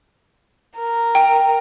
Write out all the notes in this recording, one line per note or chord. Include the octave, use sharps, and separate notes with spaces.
A#4
G5